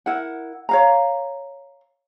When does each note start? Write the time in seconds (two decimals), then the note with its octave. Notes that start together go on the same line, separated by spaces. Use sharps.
0.06 E4 A#4 F#5
0.69 C#5 F5 A#5